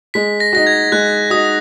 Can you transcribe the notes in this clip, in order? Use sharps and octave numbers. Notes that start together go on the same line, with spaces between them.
G#3 B6
A#6
D#4 F#4 A#6
G#6
G#3 F#6
D#4 F#4 D#6